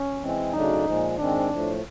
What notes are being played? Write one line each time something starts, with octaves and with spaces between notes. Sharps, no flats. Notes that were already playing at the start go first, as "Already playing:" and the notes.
Already playing: C#4
E3 G#3 C4
D2 C#3 F#3 A3 D4 D#4
A#2 F3 G#3
G#2 D#3 G#3 C4 D4
A2 F3 A3